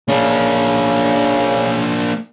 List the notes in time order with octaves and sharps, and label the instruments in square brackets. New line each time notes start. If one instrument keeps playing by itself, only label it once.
[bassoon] C#3 [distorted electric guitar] A#3 D4